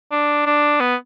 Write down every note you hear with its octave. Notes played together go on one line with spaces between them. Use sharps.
D4
D4
B3